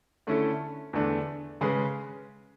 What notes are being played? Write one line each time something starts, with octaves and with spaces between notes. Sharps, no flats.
D3 A3 C#4 E4 A4
E2 D3 A3 D4
C#3 G#3 C#4 G#4 B4